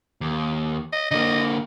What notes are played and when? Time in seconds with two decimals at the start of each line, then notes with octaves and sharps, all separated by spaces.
0.21 D#2
0.93 D#5
1.11 D3 A#3 D#5